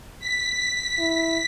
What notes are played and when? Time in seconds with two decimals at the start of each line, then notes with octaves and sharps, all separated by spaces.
0.20 B6
0.99 E4